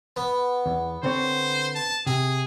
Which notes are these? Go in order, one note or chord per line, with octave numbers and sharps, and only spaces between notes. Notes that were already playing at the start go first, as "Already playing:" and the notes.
B3
E2
D3 C4 C5 C#5
A5
C3 G#4